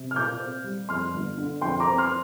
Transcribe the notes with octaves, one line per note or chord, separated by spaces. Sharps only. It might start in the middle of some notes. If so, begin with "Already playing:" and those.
Already playing: C3
F6
A#2 D6 G6
C4
G3
F2 C6 F6
G1
D3
F2 G5 C6
A#5 D6
C4
C6 F6